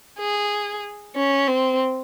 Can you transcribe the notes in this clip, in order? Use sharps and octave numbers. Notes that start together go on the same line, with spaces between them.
G#4
C#4
C4